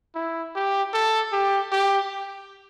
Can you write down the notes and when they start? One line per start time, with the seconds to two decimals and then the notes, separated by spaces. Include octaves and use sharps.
0.15 E4
0.55 G4
0.94 A4
1.32 G4
1.72 G4